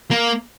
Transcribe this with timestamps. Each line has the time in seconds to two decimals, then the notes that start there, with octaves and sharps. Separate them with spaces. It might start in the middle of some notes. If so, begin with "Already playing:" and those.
0.11 A#3